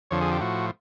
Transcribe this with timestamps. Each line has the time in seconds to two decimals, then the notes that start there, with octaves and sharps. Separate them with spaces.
0.11 F2 D3 F3 C#5
0.21 G#4
0.31 G4
0.41 A2 F3 F#4